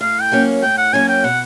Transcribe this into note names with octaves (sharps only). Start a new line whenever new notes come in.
A2 F5
G5
F#3 A#3 C#4
A2 G5
F#5
F#3 A#3 C#4 G#5
G5
B2 F#5